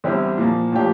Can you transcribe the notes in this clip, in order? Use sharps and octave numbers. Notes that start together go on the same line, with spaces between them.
E2 D3 G3 C4 E4
A#2 F3 A#3
A2 F3 A#3 D4 G4